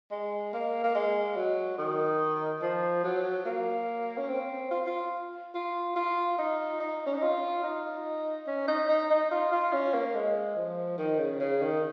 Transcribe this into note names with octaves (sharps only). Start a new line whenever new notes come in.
G#3
A#3
A#3
G#3
F#3
D#3
F3
F#3
A#3
C#4
C4
F4
F4
F4
F4
D#4
D#4
C#4
D#4
F4
D#4
C#4
D#4
D#4
D#4
F4
F4
C#4
A#3
G#3
F3
D#3
C#3
C#3
D#3